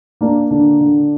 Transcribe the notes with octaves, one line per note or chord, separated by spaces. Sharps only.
A#3 D4
D3 D4
D3